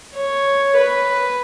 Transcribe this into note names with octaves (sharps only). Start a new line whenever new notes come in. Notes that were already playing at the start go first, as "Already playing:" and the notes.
C#5
B4